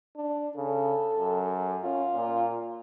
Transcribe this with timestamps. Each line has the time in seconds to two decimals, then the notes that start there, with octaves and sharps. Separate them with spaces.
0.16 D4
0.57 C#3 A4
1.18 F#2
1.84 C#4 F4
2.15 A#2